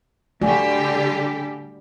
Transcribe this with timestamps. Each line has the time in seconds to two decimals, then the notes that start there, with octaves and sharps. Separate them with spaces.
0.42 D3 G3 A3 F#4 G4 D5 G#5